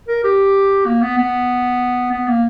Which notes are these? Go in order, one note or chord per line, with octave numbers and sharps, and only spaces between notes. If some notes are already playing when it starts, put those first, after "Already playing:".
A#4
G4
A#3
B3
B3
B3
A#3